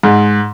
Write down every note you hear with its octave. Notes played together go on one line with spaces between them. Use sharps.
G#2